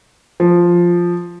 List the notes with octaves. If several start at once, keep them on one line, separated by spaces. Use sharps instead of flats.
F3